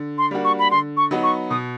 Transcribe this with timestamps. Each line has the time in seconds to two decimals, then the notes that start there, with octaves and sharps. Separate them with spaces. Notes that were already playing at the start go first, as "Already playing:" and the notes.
Already playing: D3
0.18 C6
0.31 G3 A#3 D4 F#4
0.44 C#6
0.59 B5
0.71 D3 C6
0.97 C#6
1.11 F#3 B3 D#4 F#4
1.23 C#6
1.50 B2 D#6